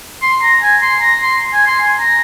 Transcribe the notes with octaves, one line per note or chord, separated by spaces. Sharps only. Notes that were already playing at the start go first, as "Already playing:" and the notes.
C6
A#5
G#5
C6
A#5
C6
G#5
C6
G#5
A#5